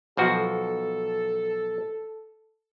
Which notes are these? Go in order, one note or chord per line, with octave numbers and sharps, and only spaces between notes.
B1 F3 F#4 A4